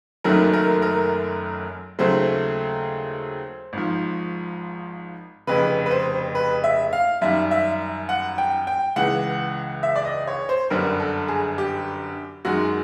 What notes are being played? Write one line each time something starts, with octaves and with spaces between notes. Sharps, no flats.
F#1 F#2 D#3 F#3 A3 A#4
A#4
A#4
D#2 C#3 F#3 A3 C5
G#1 G#2 F3
F1 F2 C#3 B4
B4
C5
B4
E5
F5
F#2 D#3 G3 E5
E5
F#5
G5
G5
C#2 C#3 E3 F#5
E5
D5
D#5
C#5
C5
G1 F#2 D3 G3 A#4
A4
G#4
G4
F#2 D#3 G#3 F#4